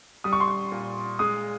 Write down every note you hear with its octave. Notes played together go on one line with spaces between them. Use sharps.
G3 D#6
C#6
C6
C#6
A#2
G#3 D#6